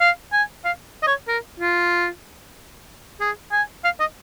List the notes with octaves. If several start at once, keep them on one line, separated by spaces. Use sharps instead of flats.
F5
G#5
F5
D#5
C#5
A#4
F4
G#4
G#5
F5
D#5